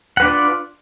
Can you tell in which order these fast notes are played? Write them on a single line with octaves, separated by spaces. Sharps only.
F#5 B4 D4 D5 F4